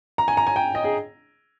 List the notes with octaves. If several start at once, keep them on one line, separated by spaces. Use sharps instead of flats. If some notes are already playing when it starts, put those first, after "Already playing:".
A#5
G#5
A#5
G#5
G5
D#5
G#4